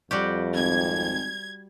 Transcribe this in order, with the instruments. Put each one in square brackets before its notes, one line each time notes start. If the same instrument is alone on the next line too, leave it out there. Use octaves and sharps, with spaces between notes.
[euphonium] F2 [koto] G3 F#4 G4
[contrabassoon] G#1 [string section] G#6